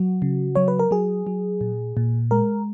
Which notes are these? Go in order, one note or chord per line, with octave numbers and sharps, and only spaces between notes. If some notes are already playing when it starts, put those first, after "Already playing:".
Already playing: F#3 F#4
C#3
F#3 C#5
B4
A#4
F#3 G#4
F#3
A#2
A#2
G#3 A#4